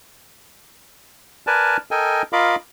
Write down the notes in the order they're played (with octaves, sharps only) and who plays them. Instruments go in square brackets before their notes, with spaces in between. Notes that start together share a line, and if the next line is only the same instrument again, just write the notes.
[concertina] A#4 B4 D5 G#5 A5
A4 A#4 D#5 G5 G#5
F4 A#4 D#5 F5 B5 D6